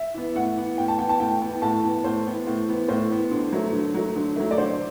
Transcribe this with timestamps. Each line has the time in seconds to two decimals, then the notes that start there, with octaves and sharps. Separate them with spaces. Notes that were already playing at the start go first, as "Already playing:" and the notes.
Already playing: E5
0.14 E3 B3
0.35 A2 F#5
0.57 E3 B3
0.78 A2 G5
0.88 A5
0.98 E3 B3 G5
1.09 A5
1.20 A2 G5
1.42 E3 B3
1.62 A2 A5
1.84 E3 B3
2.04 A2 C5
2.26 E3 B3
2.47 A2
2.68 E3 B3
2.88 A2 C5
3.09 E3 B3
3.31 D3
3.53 F#3 A3
3.73 D3
3.94 F#3 A3
4.16 D3
4.36 F#3 A3
4.51 D5
4.58 D3 C5